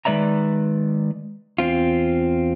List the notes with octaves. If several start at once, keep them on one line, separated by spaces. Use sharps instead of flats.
D#3 G#3 B4 D5 E5 A#5
E2 C4 F4